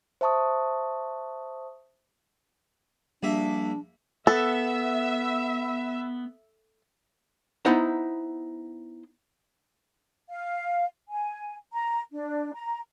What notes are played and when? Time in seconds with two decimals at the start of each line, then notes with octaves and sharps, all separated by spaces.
0.21 C5 E5 A5 C#6 D#6
3.23 A#1 G3 A#3 D4 E5
4.27 B3 A4 E5
7.65 B3 D#4 E4 C5 F#5 A#5
10.29 F5
11.10 G#5
11.73 A#5
12.13 D4
12.54 A#5